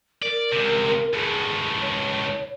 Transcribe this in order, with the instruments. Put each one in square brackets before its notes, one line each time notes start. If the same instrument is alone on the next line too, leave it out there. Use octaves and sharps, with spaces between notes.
[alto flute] A#4 [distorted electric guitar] D5
[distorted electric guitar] C#2 C3
[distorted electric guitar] C#2 A2 [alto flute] G#4
[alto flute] C#5